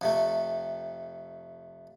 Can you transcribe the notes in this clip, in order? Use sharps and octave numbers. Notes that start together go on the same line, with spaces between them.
F2 C3 A3